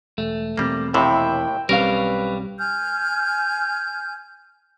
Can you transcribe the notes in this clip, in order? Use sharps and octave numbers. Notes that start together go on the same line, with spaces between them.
E1 A3
E2 B2 G3 A#3 C4
D#2 A2 C3 E4 G5
B1 G3 C4 C#4 A#4 B4 F5
G#5 F6 G6